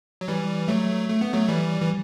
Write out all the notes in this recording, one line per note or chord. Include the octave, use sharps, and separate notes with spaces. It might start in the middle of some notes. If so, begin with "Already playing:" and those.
F#3
E3 G3
F#3 A3
A3
B3
F#3 A3
E3 G3
E3